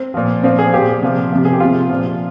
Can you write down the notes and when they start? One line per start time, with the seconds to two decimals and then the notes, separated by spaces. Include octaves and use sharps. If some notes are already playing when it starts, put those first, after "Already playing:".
Already playing: C4
0.14 A#2 F3
0.43 A#2 F3 C4
0.59 G#4
0.73 A#2 F3 G4
1.02 C3 F3
1.32 C3 F3
1.45 G#4
1.52 G4
1.60 C3 F3 F4
1.90 A#2 F3